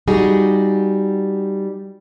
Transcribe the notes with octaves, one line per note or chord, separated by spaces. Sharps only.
G3 D#4 F#4 G#4